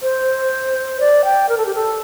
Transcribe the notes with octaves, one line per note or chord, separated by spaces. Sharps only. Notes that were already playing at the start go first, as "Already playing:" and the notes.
C5
D5
G5
A#4
A4
G4
A4